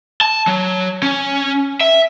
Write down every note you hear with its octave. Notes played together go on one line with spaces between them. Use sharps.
A5
F#3
C#4
E5